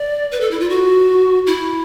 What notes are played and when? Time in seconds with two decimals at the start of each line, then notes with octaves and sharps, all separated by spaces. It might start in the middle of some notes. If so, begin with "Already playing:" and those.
Already playing: D5
0.32 B4
0.41 A4
0.51 E4
0.60 F4
0.69 F#4
1.47 E4